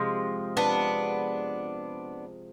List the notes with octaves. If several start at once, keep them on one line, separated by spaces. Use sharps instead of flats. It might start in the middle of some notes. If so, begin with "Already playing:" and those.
Already playing: C3 F3 G#3
B3 D4